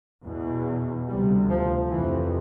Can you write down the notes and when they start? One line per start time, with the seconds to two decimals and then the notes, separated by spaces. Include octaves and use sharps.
0.25 E2 B2
1.08 D2 C3 G3
1.49 F3
1.91 F2 C3 E3